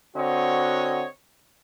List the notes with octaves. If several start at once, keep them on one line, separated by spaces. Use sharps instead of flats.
D3 C4 F#4 C#5 D#5